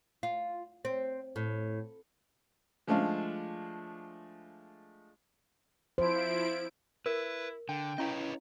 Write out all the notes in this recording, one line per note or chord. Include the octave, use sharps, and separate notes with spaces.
F4
C4
A2
F3 G#3 A3 D4 F5
F3 E4 C5 D7
E4 A#4 B4
D3 G5
C#4 E4 B4 C#5 D#5 F5